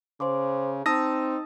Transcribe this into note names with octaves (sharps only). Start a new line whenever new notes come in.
C#3 C5 C6 D6
C4 D#4 A5 D#6 E6 A#6